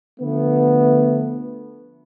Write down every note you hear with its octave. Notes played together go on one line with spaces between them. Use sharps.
D3 F3 A3 B3